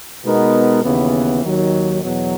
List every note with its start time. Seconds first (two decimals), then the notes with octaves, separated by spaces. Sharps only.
0.25 B2 G#3 B3 D#4 A#4
0.84 D#2 C#3 E3 B3
1.43 D#2 D#3 F#3
2.03 E2 B2 F#3